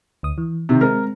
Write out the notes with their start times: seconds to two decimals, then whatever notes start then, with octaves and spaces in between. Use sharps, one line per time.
0.23 D2 D#6
0.38 E3
0.69 C3 D#3
0.81 G#3 C4 A#4